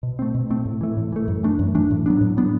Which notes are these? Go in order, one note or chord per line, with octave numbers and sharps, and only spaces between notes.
B2
A3 C4
B2
A3 C4
A2
E3 A3
A2
E3 A3
F#2
E3 A3 D4
F#2
E3 A3 D4
A2
F#3 B3 D4
A2
F#3 B3 D4